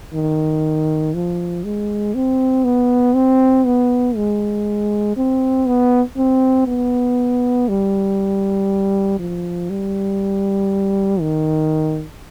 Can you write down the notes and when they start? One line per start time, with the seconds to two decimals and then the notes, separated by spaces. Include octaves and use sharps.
0.13 D#3
1.14 F3
1.64 G#3
2.15 C4
2.64 B3
3.15 C4
3.66 B3
4.16 G#3
5.17 C4
5.67 B3
6.17 C4
6.67 B3
7.69 G3
9.20 F3
9.70 G3
11.21 D#3